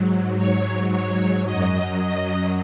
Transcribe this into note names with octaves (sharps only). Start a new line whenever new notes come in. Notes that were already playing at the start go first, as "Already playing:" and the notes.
Already playing: G#2 F#3
C#5
C#5
F#2 F#3 D#5
D#5